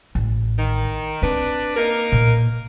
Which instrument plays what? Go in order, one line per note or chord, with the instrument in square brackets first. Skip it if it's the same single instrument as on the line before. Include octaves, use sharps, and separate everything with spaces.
[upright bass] A1
[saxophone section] D#3
[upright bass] C4 [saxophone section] D4 B4
[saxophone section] A#3 D#4 A#4
[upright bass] A#2